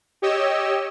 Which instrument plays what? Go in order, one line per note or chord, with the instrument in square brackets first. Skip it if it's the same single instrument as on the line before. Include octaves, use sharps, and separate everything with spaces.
[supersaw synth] G4 C#5 D#5 E6